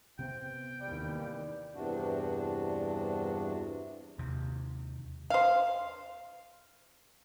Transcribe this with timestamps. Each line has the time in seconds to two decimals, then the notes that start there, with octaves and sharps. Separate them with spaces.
0.19 C3 B3 C4 G5
0.80 D#2 E3 G3
1.75 E2 G2 C3 D4 F#4
4.18 D#2 C3
5.30 C5 F5